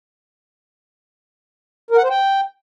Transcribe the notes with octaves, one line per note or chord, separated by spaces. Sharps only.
A#4
F#5
C5
G5